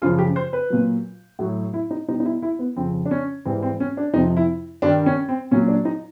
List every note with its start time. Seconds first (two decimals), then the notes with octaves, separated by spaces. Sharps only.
0.02 F#2 C#3 F3 F4
0.18 G4
0.36 C5
0.53 B4
0.70 A#2 F#3
1.39 A2 F#3 F#4
1.74 E4
1.91 D#4
2.08 B2 G3 D#4
2.20 D#4
2.25 E4
2.42 E4
2.59 B3
2.76 F2 C#3 F3 C4
3.06 D4
3.11 C#4
3.45 G#2 E3 G3 C4
3.62 C4
3.80 C#4
3.97 D4
4.14 F2 C3 F3 D#4
4.37 E4
4.82 G2 D#3 G3 D4
5.06 C#4
5.29 C4
5.51 A#2 F#3 C#4
5.68 D4
5.85 D#4